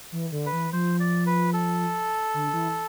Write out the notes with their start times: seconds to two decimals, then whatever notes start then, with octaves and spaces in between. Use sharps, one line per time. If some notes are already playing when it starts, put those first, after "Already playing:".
0.12 E3
0.32 D3
0.46 B4
0.53 E3
0.73 F3 C5
1.00 D5
1.26 B4
1.53 A4
2.34 D3
2.53 E3